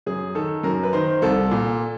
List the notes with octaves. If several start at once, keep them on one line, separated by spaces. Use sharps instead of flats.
F#2 G#4
D#3 A4
F#2 A#4
B4
D#3 C5
C2 A4
A#2